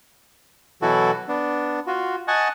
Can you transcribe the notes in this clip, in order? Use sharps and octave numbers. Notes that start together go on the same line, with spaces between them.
B2 E3 F#3 E4 F#4 A4
B3 D4
F4 F#4
D#5 F#5 G#5 A5 C#6